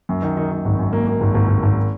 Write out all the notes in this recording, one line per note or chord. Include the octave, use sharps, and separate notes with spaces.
F#2
D#3
D#3
D#3
G#1
F#2
A#3
A#3
G#1
G#1
G#1
G#1